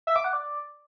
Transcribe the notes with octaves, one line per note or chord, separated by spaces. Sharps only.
E5
D6
F#5
D5